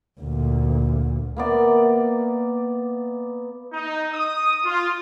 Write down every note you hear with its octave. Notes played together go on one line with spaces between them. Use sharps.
D2 A#2
A#3 B3 D5 E5
D#4
D#6
F4